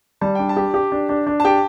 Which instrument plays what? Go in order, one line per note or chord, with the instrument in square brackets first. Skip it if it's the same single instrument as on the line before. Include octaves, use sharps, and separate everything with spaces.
[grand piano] G3 [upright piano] A5
[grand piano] D4 [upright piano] G5
[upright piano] A5
[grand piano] G4
G4
D4
D4
D4
[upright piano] A5
[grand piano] G4 [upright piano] G5